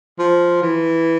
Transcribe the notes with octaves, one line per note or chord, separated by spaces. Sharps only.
F3
E3